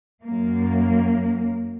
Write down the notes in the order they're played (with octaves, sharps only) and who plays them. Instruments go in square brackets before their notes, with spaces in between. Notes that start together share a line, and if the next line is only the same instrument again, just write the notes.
[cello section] F#2 A#3